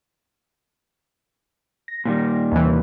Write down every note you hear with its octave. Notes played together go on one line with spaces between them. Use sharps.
A#6
A#2 D#3 G3
D#2 C3 E3